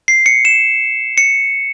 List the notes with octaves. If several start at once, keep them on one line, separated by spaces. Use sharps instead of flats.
C7
C#7
E7
C#7